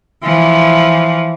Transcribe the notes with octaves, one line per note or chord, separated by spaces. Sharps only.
E3 F3